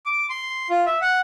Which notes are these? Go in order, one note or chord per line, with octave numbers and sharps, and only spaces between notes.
D6
C6
F4
E5
F#5